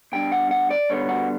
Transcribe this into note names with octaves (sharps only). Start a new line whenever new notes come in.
B2 G3 D4 G5
F#5
F#5
D5
G2 D3 G3 B3 C#5
F#4